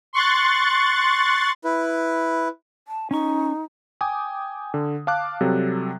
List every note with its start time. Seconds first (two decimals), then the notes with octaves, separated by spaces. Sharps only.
0.13 C6 C#6 F#6 A6
1.64 E4 B4
2.88 A5
3.11 C#4 D#4 C#6
4.01 G5 G#5 D6 D#6
4.74 D3
5.07 F5 A5 D6 F#6
5.41 C3 F#3 G3 A4